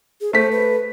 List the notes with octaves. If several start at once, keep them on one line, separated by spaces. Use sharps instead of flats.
G#4
A3 C5 B6
B4